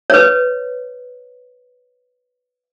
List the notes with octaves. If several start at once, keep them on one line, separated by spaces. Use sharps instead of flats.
B4 C#5